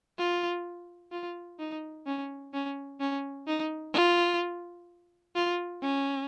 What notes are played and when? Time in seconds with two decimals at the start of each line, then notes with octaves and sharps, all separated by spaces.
0.18 F4
1.12 F4
1.59 D#4
2.07 C#4
2.53 C#4
3.00 C#4
3.48 D#4
3.94 F4
5.35 F4
5.82 C#4